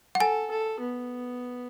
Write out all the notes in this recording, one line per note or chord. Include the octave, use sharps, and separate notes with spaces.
F#5
A4 G#5
A4
B3